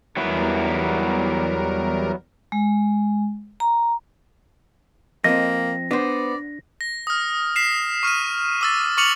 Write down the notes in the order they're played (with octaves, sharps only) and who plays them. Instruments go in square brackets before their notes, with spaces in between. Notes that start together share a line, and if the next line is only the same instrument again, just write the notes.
[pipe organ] E2 G3 A#4 [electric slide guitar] F#3 B3 E4
[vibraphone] G#3
A#5
[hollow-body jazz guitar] F2 C4 [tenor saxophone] A#3 [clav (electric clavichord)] D#5 [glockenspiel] A#6
[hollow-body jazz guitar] B3 C5 [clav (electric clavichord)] D4 [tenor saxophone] D5
[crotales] A#6
D#6 F6
B6 C7 E7
C#6 F6 C7 D#7
D6 E6 A6
C#6 D6 F6 C#7 F7 F#7